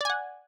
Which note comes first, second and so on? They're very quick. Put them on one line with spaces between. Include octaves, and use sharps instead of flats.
D5 G#5 F#5